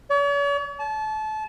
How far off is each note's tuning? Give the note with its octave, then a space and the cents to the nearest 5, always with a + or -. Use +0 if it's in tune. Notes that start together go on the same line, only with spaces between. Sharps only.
C#5 +45
A5 -30